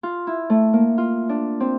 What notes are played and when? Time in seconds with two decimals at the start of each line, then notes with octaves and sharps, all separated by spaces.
0.03 F4
0.27 E4
0.50 A3
0.73 A#3
0.98 F4
1.29 D4
1.60 C4